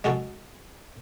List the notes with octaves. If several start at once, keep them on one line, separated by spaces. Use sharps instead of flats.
G#3 F#4 A4